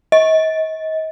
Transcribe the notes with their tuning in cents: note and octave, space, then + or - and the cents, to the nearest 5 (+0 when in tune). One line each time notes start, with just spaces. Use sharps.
D#5 +35